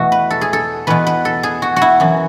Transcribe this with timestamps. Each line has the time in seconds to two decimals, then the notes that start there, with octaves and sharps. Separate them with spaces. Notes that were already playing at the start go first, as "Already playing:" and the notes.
Already playing: E2 B2 A3 F#4
0.12 B4
0.30 A4
0.41 G#4
0.53 A4
0.87 E2 B2 B4
1.07 B4
1.25 A4
1.43 G#4
1.62 F#4
1.76 F#4
1.82 E4
2.00 F#2 E3